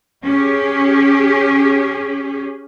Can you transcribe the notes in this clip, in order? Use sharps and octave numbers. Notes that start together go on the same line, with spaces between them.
C#4 G4 G#4